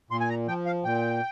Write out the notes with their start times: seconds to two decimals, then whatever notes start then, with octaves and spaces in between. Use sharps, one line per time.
0.10 A#2 C6
0.20 G#5
0.30 A#5
0.47 F3 G5
0.66 F5
0.84 A#2 G5